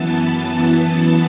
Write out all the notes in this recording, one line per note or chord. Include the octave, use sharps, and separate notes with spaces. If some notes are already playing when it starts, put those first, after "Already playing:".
Already playing: F#2 E3 B3 A5